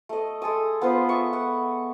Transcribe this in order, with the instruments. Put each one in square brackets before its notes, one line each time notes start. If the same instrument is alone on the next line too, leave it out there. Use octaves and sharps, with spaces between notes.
[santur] A3 D#5
G#3 A4 G#5 D#6
B3 F4 B4 C5
E5 C#6
F#5